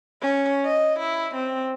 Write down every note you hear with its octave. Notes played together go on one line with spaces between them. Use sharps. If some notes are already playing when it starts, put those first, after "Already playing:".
C#4
D#5
E4
C4